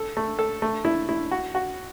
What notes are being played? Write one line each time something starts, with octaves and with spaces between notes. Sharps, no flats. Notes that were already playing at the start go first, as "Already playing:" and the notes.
Already playing: A4
A3
A4
A3
E4
E4
F#4
F#4